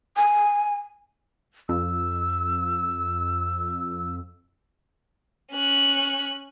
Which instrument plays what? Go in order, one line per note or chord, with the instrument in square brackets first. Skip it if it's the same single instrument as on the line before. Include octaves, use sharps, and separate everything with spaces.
[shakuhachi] G#5
[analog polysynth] F2 [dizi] E6
[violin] C#4 F#6